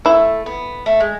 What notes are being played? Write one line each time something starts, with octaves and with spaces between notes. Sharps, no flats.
A3 E4
B3
A3
G#3